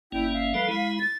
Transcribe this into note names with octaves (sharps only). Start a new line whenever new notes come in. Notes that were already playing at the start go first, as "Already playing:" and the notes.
G1 A#3 C#4 E4 G5
E5 F5
F3 G3 A4 B4
G#3 E4 B5
A6